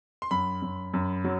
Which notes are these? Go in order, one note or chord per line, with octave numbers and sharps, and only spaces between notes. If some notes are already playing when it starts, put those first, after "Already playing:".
C6
F#2 B5
F#2
F#2
F#3